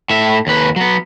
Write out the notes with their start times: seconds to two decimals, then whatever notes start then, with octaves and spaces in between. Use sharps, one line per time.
0.10 A2 E5
0.47 D#2 B4
0.76 F#3 B3